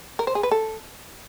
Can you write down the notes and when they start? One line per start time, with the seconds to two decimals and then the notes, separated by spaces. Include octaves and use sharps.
0.19 A#4
0.27 C5
0.35 G#4
0.43 B4
0.51 A4